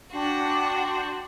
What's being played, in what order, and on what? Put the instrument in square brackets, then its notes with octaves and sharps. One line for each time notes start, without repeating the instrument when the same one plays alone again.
[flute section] D4 [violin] F#4 [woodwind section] G5 C6